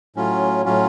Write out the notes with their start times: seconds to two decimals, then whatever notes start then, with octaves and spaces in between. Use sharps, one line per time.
0.16 A2 F#3 C#4 F4
0.65 A2 F#3 C#4 F4